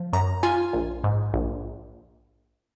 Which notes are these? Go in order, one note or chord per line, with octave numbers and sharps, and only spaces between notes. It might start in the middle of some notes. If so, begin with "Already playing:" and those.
Already playing: F3
F#2 A#5
F4 G#5
A#1
G#2
A#1